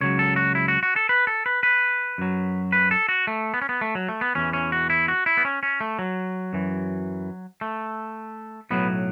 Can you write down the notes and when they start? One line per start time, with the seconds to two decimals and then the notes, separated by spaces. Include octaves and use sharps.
0.01 C#2 C#3 F#3 C#5
0.19 A4
0.36 F#4
0.55 E4
0.68 F#4
0.83 F#4
0.96 A4
1.09 B4
1.27 A4
1.46 B4
1.63 B4
2.18 F#2 F#3
2.72 B4
2.91 A4
3.09 F#4
3.27 A3
3.54 B3
3.62 C#4
3.69 B3
3.81 A3
3.95 F#3
4.08 A3
4.21 B3
4.35 E2 E3 C#4
4.53 C#4
4.72 F#4
4.90 E4
5.08 F#4
5.26 E4
5.37 B3
5.45 C#4
5.63 C#4
5.81 A3
5.99 F#3
6.53 F#2 E3
7.61 A3
8.70 B1 A2 F#3 B3